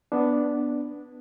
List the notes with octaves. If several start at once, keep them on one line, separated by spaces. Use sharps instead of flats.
B3 D4